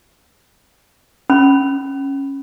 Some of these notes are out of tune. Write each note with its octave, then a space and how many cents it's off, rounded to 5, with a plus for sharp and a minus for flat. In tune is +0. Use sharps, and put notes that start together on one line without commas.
C#4 -15 B5 +0